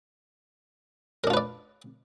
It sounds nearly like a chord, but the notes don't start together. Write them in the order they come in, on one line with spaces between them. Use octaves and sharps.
A#4 D4 F4 B4 D5